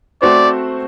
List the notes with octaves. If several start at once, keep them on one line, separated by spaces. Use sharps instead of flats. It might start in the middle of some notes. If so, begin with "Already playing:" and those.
A3 C4 F#4 C5 D5